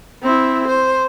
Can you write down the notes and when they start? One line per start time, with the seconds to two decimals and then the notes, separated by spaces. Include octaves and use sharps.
0.22 C4 E4
0.67 C5